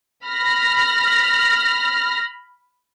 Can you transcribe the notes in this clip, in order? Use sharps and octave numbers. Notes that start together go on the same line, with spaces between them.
B5 F6 A#6